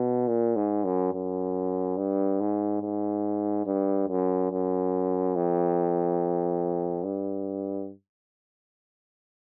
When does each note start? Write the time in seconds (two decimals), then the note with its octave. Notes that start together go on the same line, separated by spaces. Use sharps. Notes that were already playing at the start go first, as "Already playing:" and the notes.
Already playing: B2
0.28 A#2
0.56 G#2
0.84 F#2
1.13 F#2
1.97 G2
2.40 G#2
2.81 G#2
3.66 G2
4.08 F#2
4.51 F#2
5.35 F2
7.04 G2